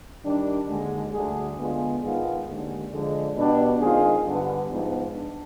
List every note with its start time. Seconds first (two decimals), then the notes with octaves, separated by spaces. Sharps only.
0.24 D#3 G3 D4
0.68 D#2 D3 G#3
1.13 D2 D3 G3 D4 G#4
1.57 D3 G#3 B3 F4
2.02 G#2 D#3 B3 F4 G#4
2.47 D#2 D3 G#3 D4
2.91 D3 F3 G#3
3.36 B2 B3 D4 G4
3.81 D#3 G#3 C4 F4 G#4
4.25 G2 D3 G3 B3 D4
4.70 G#2 F3 B3
5.15 D4